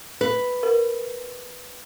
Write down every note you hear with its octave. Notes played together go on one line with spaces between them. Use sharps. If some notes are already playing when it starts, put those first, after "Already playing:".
B4
A#4